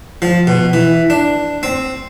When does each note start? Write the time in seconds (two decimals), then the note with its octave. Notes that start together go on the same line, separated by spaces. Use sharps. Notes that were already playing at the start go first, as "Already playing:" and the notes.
0.22 F3
0.47 B2
0.73 E3
1.10 D4
1.63 C4